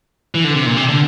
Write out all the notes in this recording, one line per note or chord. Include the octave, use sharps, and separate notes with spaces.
E3
D3
C3
A#2
C3
D3